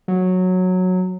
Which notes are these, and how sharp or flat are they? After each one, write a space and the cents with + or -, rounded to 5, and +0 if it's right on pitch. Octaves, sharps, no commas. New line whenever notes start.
F#3 -10